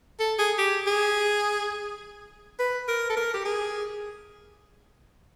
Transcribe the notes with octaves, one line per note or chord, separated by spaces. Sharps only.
A4
G#4
G4
G#4
B4
A#4
A4
A#4
G4
G#4